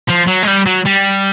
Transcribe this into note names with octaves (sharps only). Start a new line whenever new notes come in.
F3
F#3
G#3
G3
F#3
G3